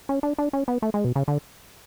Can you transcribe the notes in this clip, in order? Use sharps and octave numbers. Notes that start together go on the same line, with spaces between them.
C#4
D4
D4
C#4
B3
A3
G#3
B2
C#3
D3